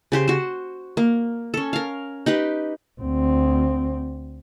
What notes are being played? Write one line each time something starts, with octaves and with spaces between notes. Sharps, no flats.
C#3 G4 C5
F#4 C5
A#3
C#4 A4
A#4 F5
D#4 G4 B4
D2 C4